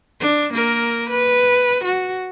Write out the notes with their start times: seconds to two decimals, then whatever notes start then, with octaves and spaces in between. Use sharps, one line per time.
0.20 D4
0.54 A#3 A#4
1.10 B4
1.84 F#4